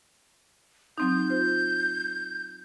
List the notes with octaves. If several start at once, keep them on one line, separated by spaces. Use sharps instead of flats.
F#3 C4 D#4 G6
F4 C5